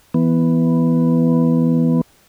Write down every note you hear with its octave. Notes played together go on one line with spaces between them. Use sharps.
E3 B3